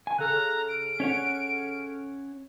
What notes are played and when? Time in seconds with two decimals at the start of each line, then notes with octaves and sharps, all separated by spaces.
0.07 G#5
0.18 C#3 A4 A#5 F6 F#6
0.69 D7
1.00 C#4 C#5 F#5